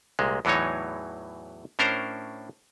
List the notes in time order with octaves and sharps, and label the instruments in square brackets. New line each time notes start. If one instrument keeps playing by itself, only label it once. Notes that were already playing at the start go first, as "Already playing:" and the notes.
[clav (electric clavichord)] C2 A#2 G#3
E2 A2 E3 F#3 D#4 C#5
A2 C#4 D4 A#4 C5 A#5